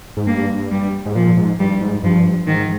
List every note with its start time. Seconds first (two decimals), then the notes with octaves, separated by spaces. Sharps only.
0.17 G#2
0.27 G2 A#3
0.71 G3
1.06 G#2
1.15 A#2 F3
1.37 G#2
1.59 G2 G3
1.81 G#2
2.03 G2 F3
2.47 G#2 D#3